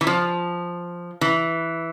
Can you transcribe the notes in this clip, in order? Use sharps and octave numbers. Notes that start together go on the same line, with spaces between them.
E3
F3
E3